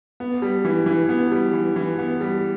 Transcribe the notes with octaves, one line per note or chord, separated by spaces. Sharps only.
B3
G3
E3
E3
B3
G3
E3
E3
B3
G3